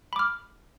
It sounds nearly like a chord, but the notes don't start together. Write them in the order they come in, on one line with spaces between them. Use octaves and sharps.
B5 D6 F6